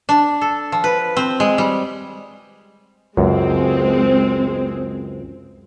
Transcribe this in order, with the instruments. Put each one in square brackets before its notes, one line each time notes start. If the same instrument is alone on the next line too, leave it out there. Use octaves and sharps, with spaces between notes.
[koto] D4
A4
F3
B4
C4
G#3
G3
[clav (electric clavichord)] C#2 F#2 [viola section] G#3 C4